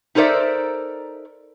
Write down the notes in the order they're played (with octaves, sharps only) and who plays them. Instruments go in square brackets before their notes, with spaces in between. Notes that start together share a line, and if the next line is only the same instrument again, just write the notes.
[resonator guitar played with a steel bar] D#4 A4 A#4 C5 D5 E5